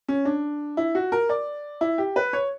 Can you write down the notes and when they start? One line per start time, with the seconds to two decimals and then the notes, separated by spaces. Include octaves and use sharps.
0.08 C#4
0.25 D4
0.77 E4
0.95 F#4
1.12 A#4
1.29 D5
1.81 E4
1.98 G4
2.16 B4
2.33 C#5